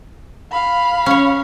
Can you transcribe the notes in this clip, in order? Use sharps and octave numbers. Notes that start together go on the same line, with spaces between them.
F5 B5
C#4 C#5